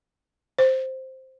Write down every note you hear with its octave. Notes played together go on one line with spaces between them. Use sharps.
C5